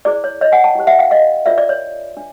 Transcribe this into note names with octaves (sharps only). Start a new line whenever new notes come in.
E4 G#4 C5 D5
C#5
C#5 D#5
F#5 G#5
G5 A5
E4 G4 C5
E5 F#5
F5 G5
D#5 F5
D4 F4 A#4 C#5 D5 E5
D5
C#5
D4